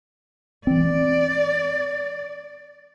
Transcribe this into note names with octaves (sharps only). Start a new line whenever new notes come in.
E3 C4 D5